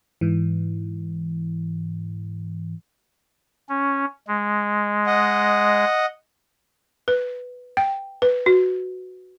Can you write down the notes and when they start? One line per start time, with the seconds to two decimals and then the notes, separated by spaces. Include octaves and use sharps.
0.21 G#2 E3
3.69 C#4
4.28 G#3
5.07 D#5 F#5
7.08 B4
7.77 G5
8.22 B4
8.46 F#4